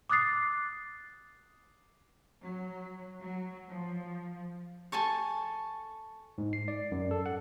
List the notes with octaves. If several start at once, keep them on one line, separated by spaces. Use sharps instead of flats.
D6 D#6 F#6 A6 C7
F#3
F#3
F3
A4 G#5 A5 C#6
G#2
C7
D5
F#2
A4
F#5